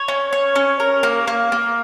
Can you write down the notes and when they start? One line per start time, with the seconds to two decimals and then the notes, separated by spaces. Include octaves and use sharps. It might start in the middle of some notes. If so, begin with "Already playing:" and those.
Already playing: C#5
0.08 C#4
0.33 C#5
0.56 C#4
0.80 A#4
1.03 A#3
1.27 A#3
1.52 A#3